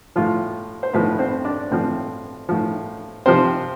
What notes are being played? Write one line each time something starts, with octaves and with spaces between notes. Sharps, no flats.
A2 F3 F4
C5
A2 F3 B3 B4
C4 C5
D4 D5
A2 F3 C4 C5
A2 F3
C3 F3 C4 C5